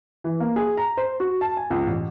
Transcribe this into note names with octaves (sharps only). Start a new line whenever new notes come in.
E3
A#3
G#4
A#5
C5
F#4
A5
G#5
C#2
A1